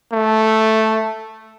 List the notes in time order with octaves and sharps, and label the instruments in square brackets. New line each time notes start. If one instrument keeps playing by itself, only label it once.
[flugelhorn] A3